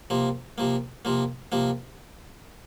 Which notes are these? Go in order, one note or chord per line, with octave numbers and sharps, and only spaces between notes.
C3 F3 A#3
C3 F3 A#3
C3 F3 A#3
C3 F3 A#3